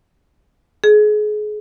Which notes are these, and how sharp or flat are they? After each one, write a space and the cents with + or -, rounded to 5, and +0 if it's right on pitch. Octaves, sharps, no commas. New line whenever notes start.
G#4 +30